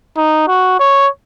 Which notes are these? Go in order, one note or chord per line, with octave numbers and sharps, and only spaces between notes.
D#4
F#4
C#5